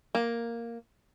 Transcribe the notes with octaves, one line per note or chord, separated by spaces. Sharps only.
A#3